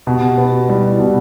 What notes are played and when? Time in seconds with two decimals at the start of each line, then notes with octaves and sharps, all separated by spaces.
0.06 B2 G4
0.28 F#4
0.38 B3
0.48 F#4
0.68 G3 E4
0.90 E4
1.00 B2